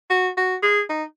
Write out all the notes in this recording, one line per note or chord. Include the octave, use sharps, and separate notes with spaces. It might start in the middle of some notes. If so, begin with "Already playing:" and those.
F#4
F#4
G#4
D#4